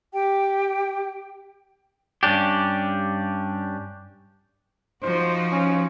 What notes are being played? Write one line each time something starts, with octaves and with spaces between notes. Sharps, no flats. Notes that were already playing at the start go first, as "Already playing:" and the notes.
G4 G5
G2 C#4 D4 G4
F3 D#4 F#4 C5
C#4